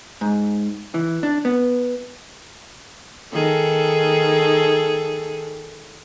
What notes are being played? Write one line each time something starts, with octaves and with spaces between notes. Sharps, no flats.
G#2
E3
D4
B3
D#3 G#4 A4